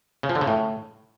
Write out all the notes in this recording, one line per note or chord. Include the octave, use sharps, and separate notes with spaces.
C#3
F3
D3
C#3
A2